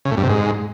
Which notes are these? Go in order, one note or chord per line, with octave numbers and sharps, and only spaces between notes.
C#3
A2
G2
C3
G#2